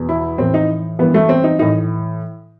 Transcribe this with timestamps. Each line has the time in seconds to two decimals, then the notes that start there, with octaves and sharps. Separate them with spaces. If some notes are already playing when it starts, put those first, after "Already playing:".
Already playing: E2 B2
0.09 E4
0.38 A2 E3 C4
0.54 D#4
0.99 G2 E3 B3
1.14 A3
1.29 C4
1.44 D#4
1.59 A2 E3 D#4